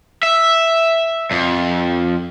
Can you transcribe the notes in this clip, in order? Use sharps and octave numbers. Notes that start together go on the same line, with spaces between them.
E5
F2